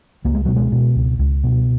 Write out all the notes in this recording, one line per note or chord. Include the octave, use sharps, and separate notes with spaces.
C#2 A#3
G#3
B2 F#3
G#3
B2
C#2
C#2
B2